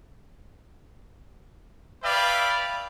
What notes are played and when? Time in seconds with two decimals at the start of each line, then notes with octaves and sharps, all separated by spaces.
2.03 B4 D5 E5 F5 G5 B5